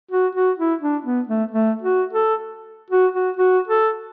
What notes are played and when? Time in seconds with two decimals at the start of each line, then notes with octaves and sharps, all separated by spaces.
0.11 F#4
0.35 F#4
0.59 E4
0.81 D4
1.05 B3
1.28 A3
1.51 A3
1.82 F#4
2.13 A4
2.90 F#4
3.14 F#4
3.37 F#4
3.68 A4